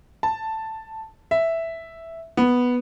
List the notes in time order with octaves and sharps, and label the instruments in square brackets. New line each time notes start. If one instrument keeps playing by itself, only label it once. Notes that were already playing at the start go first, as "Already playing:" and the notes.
[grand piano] A5
E5
B3